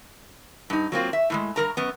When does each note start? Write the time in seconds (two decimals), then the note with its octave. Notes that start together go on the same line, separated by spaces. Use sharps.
0.70 G2 D#4
0.92 F#3 A#3 C4 F4
1.13 E5
1.30 A2 F3 G#3
1.56 G2 G3 A#4 A#5
1.77 F#2 B3